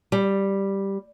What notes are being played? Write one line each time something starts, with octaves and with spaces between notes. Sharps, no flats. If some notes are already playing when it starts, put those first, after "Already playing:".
G3